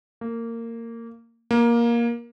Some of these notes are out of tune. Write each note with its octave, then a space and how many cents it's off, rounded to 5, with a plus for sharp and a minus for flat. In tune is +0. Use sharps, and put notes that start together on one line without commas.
A#3 -20
A#3 +15